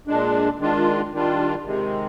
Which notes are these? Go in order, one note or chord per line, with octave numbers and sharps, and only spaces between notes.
A#2 G#3 D4
D#3 G#3 D4 F4
D#3 G3 D4 F4
C3 D#3 G#3